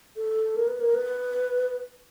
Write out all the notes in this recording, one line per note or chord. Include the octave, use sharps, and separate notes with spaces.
A4
A#4
B4
A#4
B4